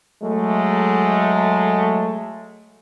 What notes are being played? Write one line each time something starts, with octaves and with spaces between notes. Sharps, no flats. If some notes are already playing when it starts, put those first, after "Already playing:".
F#3 G#3 A3